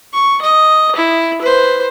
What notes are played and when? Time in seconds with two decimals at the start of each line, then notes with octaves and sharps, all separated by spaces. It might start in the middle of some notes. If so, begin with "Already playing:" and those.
0.13 C#6
0.42 D#5
0.96 E4
1.41 B4 C5